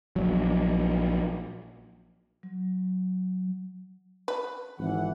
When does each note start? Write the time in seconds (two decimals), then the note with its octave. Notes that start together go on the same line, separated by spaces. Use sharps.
0.16 A#1 F#3
2.43 F#3
4.28 B4
4.79 G#1 E3 F#5